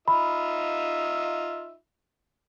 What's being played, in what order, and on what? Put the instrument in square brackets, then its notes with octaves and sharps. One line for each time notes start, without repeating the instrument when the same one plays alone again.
[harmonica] D#4 F4 E5 [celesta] B5